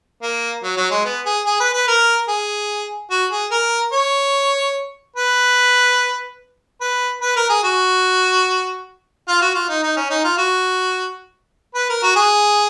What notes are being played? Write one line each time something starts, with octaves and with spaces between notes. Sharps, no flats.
A#3
F#3
F#3
G#3
B3
G#4
G#4
B4
B4
A#4
G#4
F#4
G#4
A#4
C#5
B4
B4
B4
A#4
G#4
F#4
F4
F#4
F4
D#4
D#4
C#4
D#4
F4
F#4
B4
A#4
F#4
G#4